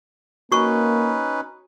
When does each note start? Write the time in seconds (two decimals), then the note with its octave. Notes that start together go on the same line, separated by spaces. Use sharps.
0.52 A#3 C#4 D#4 F#4 B4 C#6